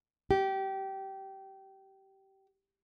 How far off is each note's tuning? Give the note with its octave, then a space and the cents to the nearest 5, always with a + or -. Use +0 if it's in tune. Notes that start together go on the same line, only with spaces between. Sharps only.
G4 -20